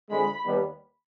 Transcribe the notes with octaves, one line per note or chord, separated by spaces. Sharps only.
F2 D3 G#3 B5
D#2 D#3 G3 B3